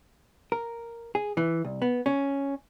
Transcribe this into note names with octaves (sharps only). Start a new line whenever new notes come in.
A#4
G#4
E3
C2
B3
C#4